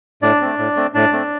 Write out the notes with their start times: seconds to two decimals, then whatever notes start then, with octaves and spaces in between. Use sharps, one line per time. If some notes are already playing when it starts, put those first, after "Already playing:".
0.22 A2 D4 D5
0.41 A3 C4
0.59 A2
0.76 A3 C4
0.94 A2 D4 D5
1.13 A3 C4